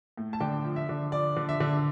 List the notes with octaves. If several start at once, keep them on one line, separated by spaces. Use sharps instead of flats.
A2
A5
D3 G5
F3
E5
D3
F3 D5
D3
E5
D3